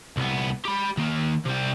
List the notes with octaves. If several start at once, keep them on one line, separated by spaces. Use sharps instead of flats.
C2 B3
G4 B5
D#3 A#3
C3 G3